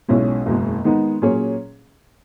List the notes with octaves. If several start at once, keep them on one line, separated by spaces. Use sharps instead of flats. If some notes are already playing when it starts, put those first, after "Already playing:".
B1 B2 G#3 C#4 E4
F#1 E2 B2 G#3
D#3 G#3 B3 D#4
A#2 F#3 C#4 G#4 C#5